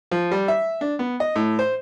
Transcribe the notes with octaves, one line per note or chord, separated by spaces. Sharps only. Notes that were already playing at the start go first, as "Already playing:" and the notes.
F3
G3
E5
D4
B3
D#5
A2
C5